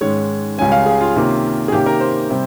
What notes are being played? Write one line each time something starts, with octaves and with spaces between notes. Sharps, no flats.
G#2 D#3 G#3 C#4 C#5
C#2 C#3 G3 C#4 G#5
F5
G#4
F4
C3 D#3 A#3 C#4
G#4
C3 D#3 A#3 C#4 G4
A#4
C5
C3 G3 C4